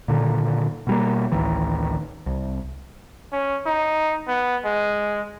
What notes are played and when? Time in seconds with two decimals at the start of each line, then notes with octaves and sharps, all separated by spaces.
0.08 A#2 D3 D#3
0.87 B2 G3 A#3
1.32 A1 D2 D#3 E3
2.26 C2
3.33 C#4
3.66 D#4
4.28 B3
4.65 G#3